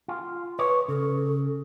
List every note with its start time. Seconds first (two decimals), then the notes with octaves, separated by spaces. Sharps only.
0.08 F4
0.59 B4 C#5
0.88 C#3 A4